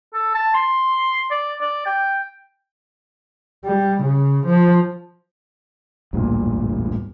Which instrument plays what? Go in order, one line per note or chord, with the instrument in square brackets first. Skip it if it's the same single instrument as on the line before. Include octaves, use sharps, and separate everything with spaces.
[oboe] A4
A5
C6
D5
D5
G5
[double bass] G3
C#3
F3
[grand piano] E1 D2 A#2 [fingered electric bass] A1 G2